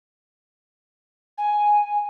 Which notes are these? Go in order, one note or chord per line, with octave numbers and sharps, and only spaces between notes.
G#5